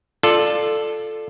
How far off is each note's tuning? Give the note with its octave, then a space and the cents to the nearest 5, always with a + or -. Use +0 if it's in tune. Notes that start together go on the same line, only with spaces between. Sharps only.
F4 +0 A4 +0 D5 +20